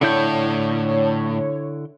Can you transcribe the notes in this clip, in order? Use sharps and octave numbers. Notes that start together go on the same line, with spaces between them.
A2 D3 E4 C#5 G6